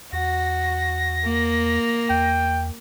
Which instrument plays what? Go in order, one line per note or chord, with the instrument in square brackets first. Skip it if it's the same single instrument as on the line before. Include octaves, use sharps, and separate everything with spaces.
[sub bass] E2 [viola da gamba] F#4 [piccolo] A#6
[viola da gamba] A#3
[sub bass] E2 [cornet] G5